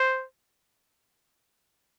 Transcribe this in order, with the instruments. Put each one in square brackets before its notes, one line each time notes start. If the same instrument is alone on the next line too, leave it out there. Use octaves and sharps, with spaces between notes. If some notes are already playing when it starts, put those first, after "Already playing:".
Already playing: [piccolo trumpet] C5